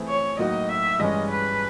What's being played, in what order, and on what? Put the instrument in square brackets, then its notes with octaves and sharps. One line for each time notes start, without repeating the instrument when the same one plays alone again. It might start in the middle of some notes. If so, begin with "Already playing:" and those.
Already playing: [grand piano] E3 A3 C4 E4 G#4
[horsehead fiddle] C#5
[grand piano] A2 F#3 A#3 D#4 F#4 [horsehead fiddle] D#5
[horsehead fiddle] E5
[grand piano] G2 E3 G#3 C#4 [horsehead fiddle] D#5
[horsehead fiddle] B4